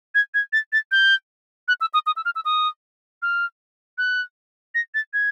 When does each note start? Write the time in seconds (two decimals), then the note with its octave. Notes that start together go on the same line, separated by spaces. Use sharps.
0.15 G#6
0.34 G#6
0.53 A6
0.73 A6
0.92 G6
1.68 F#6
1.81 E6
1.94 D#6
2.06 D#6
2.17 E6
2.25 F6
2.36 E6
2.45 D#6
3.22 F6
3.98 F#6
4.75 A#6
4.95 A6
5.13 G#6